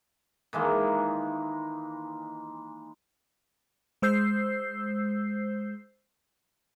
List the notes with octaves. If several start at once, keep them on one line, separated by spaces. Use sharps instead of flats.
D#3 E3 G#3 A#3
G#3 C5 E6 G6 C7